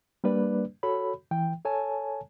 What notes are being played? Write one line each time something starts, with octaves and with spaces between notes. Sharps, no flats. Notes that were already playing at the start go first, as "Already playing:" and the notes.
G3 A#3 D4 B4 D5
F#4 A4 C#5 B5
E3 G5
A4 C#5 G#5 A5